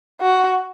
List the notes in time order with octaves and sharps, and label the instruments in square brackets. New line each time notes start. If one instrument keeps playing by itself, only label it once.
[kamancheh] F#4